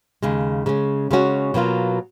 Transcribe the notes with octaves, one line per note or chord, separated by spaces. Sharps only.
D#2 C#3 G#3
C#3 G#3 C#4
C#3 G#3 C#4 F#4
B2 F#3 A#3 F4